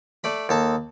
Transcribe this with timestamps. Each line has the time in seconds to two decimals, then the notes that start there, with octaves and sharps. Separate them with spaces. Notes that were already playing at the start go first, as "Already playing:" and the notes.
0.24 A3 D5 B5
0.49 D#2 A4 A5